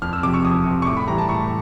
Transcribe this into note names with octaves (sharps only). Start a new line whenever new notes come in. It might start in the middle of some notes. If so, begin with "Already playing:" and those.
F2 F6
E6
C3 F3 D6
C#6
F2 D#6
C3 F3
C#6
A2 D6
B5
E3 G3 A#5
A5
A2 C#6